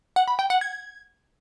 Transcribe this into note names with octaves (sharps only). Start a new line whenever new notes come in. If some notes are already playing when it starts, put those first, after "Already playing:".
F#5
B5
G5
F#5
G#6